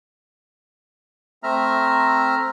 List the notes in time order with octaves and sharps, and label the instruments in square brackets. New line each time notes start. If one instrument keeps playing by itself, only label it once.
[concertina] A3 C4 E5 A#5 F6